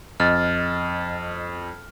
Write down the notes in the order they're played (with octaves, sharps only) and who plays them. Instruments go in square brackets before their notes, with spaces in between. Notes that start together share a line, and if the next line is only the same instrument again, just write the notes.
[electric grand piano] F2 [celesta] D#5 A6 [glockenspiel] F6